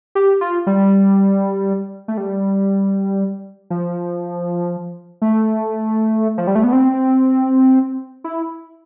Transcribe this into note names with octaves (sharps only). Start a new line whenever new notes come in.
G4
F4
G3
A3
G3
F3
A3
F3
G3
A3
B3
C4
E4